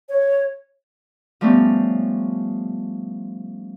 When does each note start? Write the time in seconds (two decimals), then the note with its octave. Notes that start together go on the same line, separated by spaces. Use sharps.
0.09 C#5
1.41 F3 G3 A3 B3 C#4